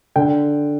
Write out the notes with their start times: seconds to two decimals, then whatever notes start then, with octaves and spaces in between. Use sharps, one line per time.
0.16 D3 G5